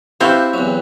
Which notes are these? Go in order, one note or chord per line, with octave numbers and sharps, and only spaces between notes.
C4 E4 F#4 G4 E5 F5
E2 F#3